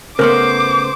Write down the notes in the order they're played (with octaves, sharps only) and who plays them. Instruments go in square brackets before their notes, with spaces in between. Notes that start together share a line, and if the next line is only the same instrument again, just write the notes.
[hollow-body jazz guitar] C#3 A3 B3 [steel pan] A#4 [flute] C5 [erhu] D6